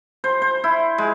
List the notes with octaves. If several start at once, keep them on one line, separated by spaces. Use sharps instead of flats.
C5
C5
E4
G#3